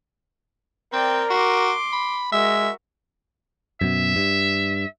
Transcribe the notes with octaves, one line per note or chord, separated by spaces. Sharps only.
C4 A#4 D5 G5
F#4 C6 D6
B5
G#3 F#4 A#4 E5
F#2 B2 E5
G2